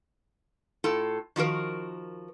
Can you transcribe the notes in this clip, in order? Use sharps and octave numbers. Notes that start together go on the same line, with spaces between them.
A2 F4 A4
D#3 F3 F#4 A#4